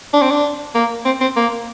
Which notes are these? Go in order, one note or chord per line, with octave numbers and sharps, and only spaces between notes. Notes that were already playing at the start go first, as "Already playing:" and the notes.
D4
C4
D4
A#3
C4
C4
A#3